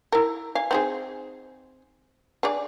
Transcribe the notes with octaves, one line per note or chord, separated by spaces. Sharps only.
E4 A#4
F5 G#5
C4 D#4 G#4
D4 G#4 D5